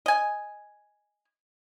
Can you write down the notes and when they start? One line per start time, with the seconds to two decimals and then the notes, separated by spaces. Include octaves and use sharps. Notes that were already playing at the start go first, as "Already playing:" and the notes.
0.06 D#5 G#5